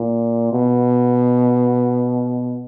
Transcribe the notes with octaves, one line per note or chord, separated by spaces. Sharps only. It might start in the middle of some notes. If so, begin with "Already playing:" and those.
Already playing: A#2
B2